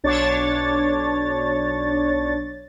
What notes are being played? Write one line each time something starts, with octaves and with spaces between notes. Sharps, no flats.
B1 D4 C#5 A6